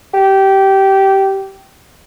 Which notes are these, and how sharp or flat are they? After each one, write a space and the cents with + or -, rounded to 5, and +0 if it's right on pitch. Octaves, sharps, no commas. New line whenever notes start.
G4 -15